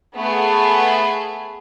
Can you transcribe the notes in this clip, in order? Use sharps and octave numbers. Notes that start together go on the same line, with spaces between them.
A3 B3 G#4